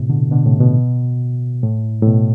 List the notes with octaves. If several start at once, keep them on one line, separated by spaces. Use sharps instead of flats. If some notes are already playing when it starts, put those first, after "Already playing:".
Already playing: A2 C3
B2 D3
B2 D3
A2 C3
B2
A2
A2
B2